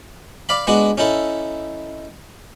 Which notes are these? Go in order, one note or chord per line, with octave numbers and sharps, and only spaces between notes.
D5 F5 B5
G#3 B3 D4 F#4
C#4 D#4 E4 A4